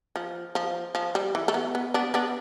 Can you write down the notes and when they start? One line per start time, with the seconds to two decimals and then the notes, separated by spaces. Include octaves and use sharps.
0.16 F3
0.55 F3
0.95 F3
1.15 G3
1.35 E3
1.48 A3
1.54 B3
1.75 B3
1.94 B3 D4
2.14 B3 D4